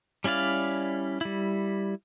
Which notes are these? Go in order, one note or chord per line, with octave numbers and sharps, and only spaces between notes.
G3 C#4 E4 D5 F5
G3 E4